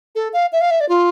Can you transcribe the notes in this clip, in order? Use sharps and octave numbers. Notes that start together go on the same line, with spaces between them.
A4
F5
E5
F5
E5
D5
F4